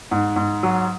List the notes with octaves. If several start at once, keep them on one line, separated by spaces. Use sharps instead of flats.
G#2
G#2
F#3